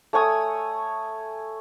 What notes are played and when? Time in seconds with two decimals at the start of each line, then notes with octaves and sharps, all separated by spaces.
0.13 A3 C#5 G#5 D#6